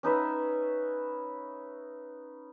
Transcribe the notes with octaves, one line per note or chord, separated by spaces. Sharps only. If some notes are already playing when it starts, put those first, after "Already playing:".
C#4 D#4 B4 E5